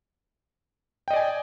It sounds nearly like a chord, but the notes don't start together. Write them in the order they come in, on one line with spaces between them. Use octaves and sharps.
G5 D#5 D5 G#5